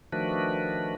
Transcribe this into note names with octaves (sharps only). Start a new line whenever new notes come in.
D#3 F3 A3 D4 F#4 B4